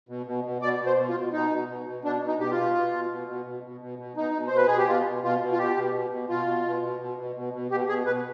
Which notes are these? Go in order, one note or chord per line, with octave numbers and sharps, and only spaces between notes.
B2
B2
B2
B2 D5
B2
C5
B2
F4
B2
B2 D#4
B2
B2
B2
B2 D4
B2
D#4
B2 G4
F4
B2
B2
B2
B2
B2
B2
B2
B2
B2
B2 D#4
B2
C5
B2 B4
B2 G#4
G4
B2 F4
B2
B2 F4
B2
F4
B2 G4
B2
B2
B2
B2 F4
B2
B2
B2
B2
B2
B2
B2
B2 G4
B2 G#4
B2 B4